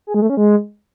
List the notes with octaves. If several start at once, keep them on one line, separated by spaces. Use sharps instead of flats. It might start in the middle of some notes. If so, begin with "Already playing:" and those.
G#4
G#3
A3
C#4
G#3